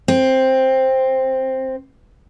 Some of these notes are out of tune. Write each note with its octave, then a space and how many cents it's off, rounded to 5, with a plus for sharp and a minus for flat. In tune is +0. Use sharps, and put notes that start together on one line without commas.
C4 +5